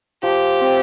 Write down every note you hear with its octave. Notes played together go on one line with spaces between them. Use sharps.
F3 G4
C4